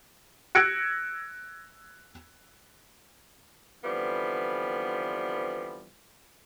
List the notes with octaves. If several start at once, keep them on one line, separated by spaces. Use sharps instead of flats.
E6 F#6 G#6 A#6 C#7 D7
D3 E3 F3 G3 B3 C4